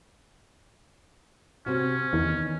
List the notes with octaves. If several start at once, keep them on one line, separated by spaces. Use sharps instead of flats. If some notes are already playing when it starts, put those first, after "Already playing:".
C3 C4 C#4 F#4
E2 D#3 B3